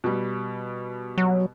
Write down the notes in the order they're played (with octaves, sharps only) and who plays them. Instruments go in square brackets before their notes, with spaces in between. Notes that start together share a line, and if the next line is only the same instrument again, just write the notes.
[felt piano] B2 G3
[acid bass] F#3